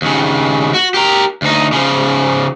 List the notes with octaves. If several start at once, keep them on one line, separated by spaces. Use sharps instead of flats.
D#2 C#3
F#4
G4 A#4
D2 D#4
C#3 F3